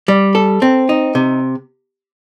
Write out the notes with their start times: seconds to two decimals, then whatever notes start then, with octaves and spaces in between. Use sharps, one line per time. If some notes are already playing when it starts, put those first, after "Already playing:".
0.08 G3
0.35 A4
0.62 C4
0.89 D#4
1.15 C3